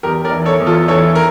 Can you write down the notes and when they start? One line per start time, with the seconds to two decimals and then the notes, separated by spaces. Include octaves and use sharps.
0.03 E2 G4 A#4
0.25 A#4 D5
0.32 E3
0.46 A4 C#5
0.60 E2
0.67 F4 A4
0.88 E3 A4 C#5
1.15 A#4